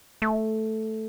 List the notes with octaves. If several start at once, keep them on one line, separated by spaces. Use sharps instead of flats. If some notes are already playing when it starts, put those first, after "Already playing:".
A3